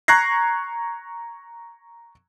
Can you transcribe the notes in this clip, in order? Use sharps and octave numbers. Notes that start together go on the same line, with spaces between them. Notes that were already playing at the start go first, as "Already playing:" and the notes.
A#5 C#6 F#6 G#6 A#6 C7